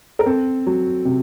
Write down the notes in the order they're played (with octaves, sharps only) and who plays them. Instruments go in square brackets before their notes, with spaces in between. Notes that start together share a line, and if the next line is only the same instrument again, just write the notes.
[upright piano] A#4
[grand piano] C4 [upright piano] A4
[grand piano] F#3
C3